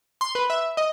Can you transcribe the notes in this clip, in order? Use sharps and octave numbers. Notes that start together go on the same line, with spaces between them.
C6
B4
E5
D#5